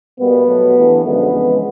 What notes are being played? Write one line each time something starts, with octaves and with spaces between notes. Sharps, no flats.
B2 G3 A#3 B3
B2 F#3 A3
G2 E3 A3
F#2 D3 F3 G#3 B3
F2 C#3 E3 G#3